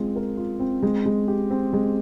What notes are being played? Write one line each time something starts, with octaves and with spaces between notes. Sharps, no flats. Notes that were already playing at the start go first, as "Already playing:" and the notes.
Already playing: G#3 C4 F4
A#4
F4
C4
G#3
G#3
G4
C4
G#3